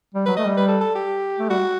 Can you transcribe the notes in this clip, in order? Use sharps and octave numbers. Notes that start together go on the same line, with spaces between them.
G3
F#3 B4
A3 D#5
G3
B4
A4
A4
G4
A3
G3 F#4